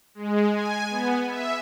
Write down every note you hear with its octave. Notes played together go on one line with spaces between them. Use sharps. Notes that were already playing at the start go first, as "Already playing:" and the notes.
G#3
G#5
B3
E5